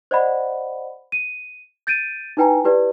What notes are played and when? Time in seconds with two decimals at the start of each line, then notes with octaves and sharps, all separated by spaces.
0.11 C5 D5 D#5 F#5 B5
1.12 D#7
1.87 G6 A6 D7 D#7
2.37 D#4 E4 B4 G5 G#5 A#5
2.64 E4 G4 B4 D5